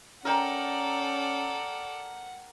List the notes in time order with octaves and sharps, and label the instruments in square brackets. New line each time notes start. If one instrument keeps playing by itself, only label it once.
[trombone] C#4 [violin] A4 D5 [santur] A#4 G5 A#5 [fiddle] F#5